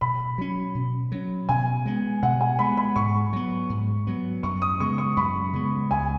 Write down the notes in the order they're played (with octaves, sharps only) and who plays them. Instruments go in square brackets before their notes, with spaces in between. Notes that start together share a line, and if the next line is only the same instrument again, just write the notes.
[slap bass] B2 [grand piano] B5
[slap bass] F#3 C#4
B2
F#3 C#4
[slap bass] B2 [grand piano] G#5
[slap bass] G#3 B3
[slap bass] B2 [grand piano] F#5
[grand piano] G#5
[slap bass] G#3 B3 [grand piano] B5
[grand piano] B5
[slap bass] G#2 [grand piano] C#6
[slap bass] F#3 B3
G#2
F#3 B3
[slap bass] F#2 [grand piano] C#6
[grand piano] D#6
[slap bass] C#3 G#3 B3 [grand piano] C#6
[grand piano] C#6
[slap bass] F#2 [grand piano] B5
[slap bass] C#3 G#3 B3
[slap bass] C#2 [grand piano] G#5